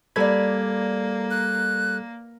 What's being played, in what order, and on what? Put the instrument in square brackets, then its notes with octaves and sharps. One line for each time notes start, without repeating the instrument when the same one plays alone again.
[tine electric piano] G3 A4 G#6 [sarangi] A#3 [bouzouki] B4 D5
[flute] F#6